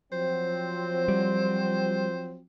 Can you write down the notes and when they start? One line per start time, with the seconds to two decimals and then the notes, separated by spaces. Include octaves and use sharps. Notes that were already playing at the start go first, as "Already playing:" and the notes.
0.12 F3 F#3 C4 C5
1.08 G3